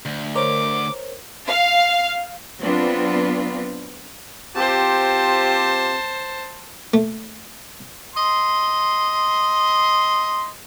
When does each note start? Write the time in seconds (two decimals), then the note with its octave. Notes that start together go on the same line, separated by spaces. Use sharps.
0.05 D2
0.35 A#4 C5 C#5 D6
1.47 F5
2.60 F#3 B3 C4 D4 F4 B4
4.56 C4 F4 G4 C5 A5
6.94 A3
8.16 D#5 C6